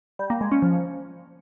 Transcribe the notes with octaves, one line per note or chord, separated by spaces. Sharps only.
G3
A#3
G#3
C#4
F3